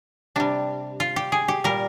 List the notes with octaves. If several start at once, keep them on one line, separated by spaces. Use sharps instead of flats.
C3 G3 D4
F4
G4
G#4
G4
A#2 G3 A#4